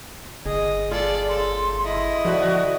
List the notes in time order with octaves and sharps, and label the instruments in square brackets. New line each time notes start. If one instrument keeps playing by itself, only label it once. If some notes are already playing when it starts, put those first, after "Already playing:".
[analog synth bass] G1 [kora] G#4 [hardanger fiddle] D#5
[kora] F4 G#4 [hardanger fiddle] A4 D5
[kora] C#3 [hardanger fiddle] A4 [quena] C6
[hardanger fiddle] E4 D#5
[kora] D3 [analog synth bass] F3 [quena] F#4